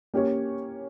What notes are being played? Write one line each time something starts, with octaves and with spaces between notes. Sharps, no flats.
A#3 C#4 G4 C#5